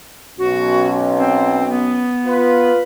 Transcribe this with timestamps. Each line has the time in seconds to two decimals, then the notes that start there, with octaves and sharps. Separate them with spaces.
0.38 B1 C#4 F#4
1.17 C4
1.69 B3
2.26 F4 B4